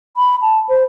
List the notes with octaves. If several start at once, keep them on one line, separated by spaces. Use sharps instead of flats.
B5
A5
C5